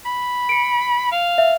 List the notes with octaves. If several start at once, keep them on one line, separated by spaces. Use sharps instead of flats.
B5
C#7 D7
F5
E5